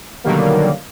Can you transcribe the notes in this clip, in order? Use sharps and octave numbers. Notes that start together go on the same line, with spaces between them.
B2 D3 D#3 F#3 G3 A#3